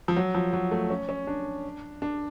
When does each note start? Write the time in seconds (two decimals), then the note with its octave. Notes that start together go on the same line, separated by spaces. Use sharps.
0.08 F3
0.16 F#3
0.35 F3
0.53 F#3
0.71 A3
0.90 C#4
1.09 C#4
1.27 D4
2.02 D4